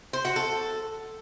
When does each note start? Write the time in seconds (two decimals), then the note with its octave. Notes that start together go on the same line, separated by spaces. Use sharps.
0.13 C5
0.25 F#4
0.36 A4